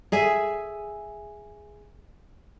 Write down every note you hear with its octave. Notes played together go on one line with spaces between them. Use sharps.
G#4 E5 G#5